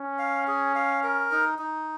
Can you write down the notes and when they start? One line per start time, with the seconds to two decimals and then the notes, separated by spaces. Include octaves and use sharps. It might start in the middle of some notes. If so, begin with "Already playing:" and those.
Already playing: C#4
0.19 F5
0.47 G#4
0.75 F5
1.03 A#4
1.31 D#4
1.59 D#4